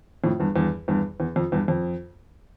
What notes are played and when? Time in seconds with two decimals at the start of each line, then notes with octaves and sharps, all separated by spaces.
0.24 F2 A2
0.40 E2 G2
0.56 E2 G2
0.88 E2 G2
1.20 E2
1.36 F2
1.52 E2 G2
1.68 F2